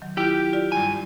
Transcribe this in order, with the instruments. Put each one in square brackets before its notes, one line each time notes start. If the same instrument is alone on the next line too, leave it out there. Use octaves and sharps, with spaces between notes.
[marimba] D#3 F#3
[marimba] E4 F4 [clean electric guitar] G4 G5
[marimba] F4 D5
[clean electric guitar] G2 G#5